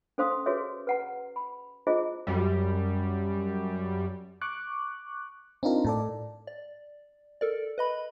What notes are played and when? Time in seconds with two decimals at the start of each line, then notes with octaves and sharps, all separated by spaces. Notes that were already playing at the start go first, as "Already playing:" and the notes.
0.18 C#4 A4 C5 F5 C6 D#6
0.46 F#4 G#4 B4 C#5 E5
0.87 B4 F#5 A#5
1.36 B5
1.87 E4 F4 G#4 C5 D#5
2.27 F#2 G3
4.42 C#6 D6 F#6
5.63 C4 D4 D#4 F4 A#4
5.84 A2 A4 D5
6.47 D5
7.41 A4 A#4 D5
7.78 B4 D#5 B5